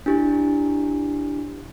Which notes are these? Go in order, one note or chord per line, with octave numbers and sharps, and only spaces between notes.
D4 E4 G4